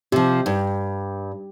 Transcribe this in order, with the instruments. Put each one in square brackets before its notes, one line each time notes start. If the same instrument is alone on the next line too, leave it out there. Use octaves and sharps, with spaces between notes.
[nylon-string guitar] C3 F3 [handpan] G4
[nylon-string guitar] G2